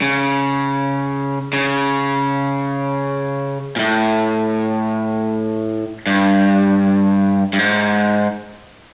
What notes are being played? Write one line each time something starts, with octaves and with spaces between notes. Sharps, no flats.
C#3
C#3
A#2
A2
G2
G2
G#2